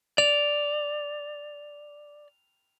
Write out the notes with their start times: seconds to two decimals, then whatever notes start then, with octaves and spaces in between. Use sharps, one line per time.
0.18 D5 F7